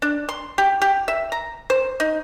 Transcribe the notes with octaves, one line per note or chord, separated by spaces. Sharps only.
D4
C6
G4
G4
E5
A#5
C5
D#4